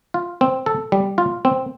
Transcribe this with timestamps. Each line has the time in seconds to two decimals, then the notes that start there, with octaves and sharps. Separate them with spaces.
0.14 F4
0.41 C4
0.66 A4
0.92 G3
1.18 F4
1.45 C4